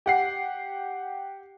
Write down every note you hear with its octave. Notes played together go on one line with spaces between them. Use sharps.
G4 F#5 C7